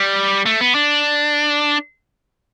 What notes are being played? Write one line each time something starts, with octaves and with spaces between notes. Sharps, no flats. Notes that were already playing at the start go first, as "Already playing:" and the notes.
Already playing: G3
A3
B3
D4